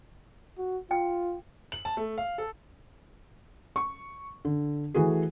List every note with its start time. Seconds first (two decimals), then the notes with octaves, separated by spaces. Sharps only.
0.58 F#4
0.91 F4 G5
1.72 F#7
1.85 A5
1.97 A3
2.18 F5
2.38 A4
3.76 C#6
4.45 D3
4.94 E3 A3 F#4 G#4